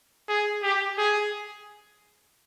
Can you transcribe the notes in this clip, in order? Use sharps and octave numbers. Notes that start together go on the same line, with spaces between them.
G#4
G4
G#4